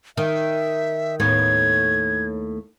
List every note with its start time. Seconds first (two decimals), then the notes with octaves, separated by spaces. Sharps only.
0.17 D#3 E5
1.20 D#2 A2 B3 G#6